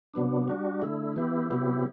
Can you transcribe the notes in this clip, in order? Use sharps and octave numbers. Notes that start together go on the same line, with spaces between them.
C3 F#3 B3 D4
G3 D4 F#4
D3 A3 E4
E3 B3 E4 G4
C3 F#3 B3 E4 G4